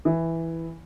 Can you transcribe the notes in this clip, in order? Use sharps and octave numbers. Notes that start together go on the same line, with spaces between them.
E3